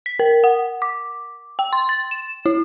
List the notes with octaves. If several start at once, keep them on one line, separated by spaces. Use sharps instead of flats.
B6
A#4
F#5
D6
G5
C6
A6
E7
E4